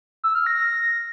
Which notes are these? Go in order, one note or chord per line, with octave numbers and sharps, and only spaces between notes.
E6
F6
A#6
A#6